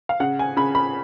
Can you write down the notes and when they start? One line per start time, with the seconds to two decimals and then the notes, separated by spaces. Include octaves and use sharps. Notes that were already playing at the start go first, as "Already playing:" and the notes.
0.09 F5
0.20 C#3 F#5
0.39 G#5
0.57 C#3 B5
0.75 B5